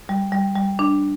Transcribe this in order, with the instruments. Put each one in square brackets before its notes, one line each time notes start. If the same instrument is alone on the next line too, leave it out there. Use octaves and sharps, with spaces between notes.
[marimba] G3
G3
G3
D4